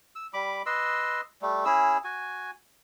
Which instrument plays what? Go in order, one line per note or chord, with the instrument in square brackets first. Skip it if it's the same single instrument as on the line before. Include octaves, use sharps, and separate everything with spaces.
[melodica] E6
G3 B5 D6
B4 D#5 C6 E6
G3 A3
C#4 E4 G#4 E6
F#4 G#5